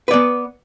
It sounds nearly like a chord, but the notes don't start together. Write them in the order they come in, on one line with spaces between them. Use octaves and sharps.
B4 D5 B3